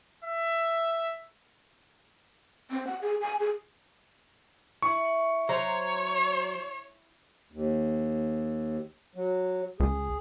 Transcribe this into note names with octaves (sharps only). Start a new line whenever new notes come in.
E5
C4
F#5
G#4
G#5
G#4
E4 C#6
F#3 C5 C#5 A#5
D#2
F#3
C#2 G#4